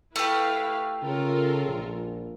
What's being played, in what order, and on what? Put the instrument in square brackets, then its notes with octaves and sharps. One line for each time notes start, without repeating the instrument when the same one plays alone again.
[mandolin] A3 G4 [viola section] E4 B4 F5
[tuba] C#3 [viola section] F4 A4 A#4
[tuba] A#1